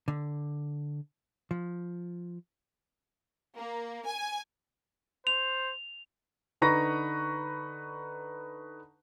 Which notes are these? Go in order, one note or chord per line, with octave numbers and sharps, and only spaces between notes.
D3
F3
A#3
G#5
C5 F7
D3 D#4 B4 A#5 C#6 A#6